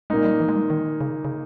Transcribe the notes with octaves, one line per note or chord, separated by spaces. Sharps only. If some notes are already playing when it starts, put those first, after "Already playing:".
A#2 G#3 A#3 D#4
G3
E3
G#3
G3
D#3
C#3
C#3